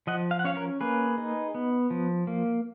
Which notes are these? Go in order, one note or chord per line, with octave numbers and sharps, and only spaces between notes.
F3 D#5 F#5
F5
F#5
C#4 C#5 F5
A#4 C#5
A#3 G#4 B4
D#4
B3
F3
A#3